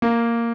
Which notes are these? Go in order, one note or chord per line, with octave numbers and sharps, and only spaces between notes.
A#3